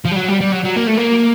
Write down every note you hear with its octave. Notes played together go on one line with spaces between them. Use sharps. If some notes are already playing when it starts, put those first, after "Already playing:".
F3
G3
F#3
G3
G3
F#3
F#3
A#3
A3
A#3